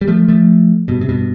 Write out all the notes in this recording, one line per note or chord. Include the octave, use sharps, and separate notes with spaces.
G3
F3 A3
F3 A3
G2 B2
C3
G2 B2